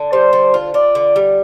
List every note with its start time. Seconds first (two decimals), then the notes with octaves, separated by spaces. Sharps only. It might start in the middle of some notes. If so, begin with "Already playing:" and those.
Already playing: D3
0.12 G3 C5
0.33 D3
0.54 F4
0.74 F4 D5
0.95 D3
1.16 G3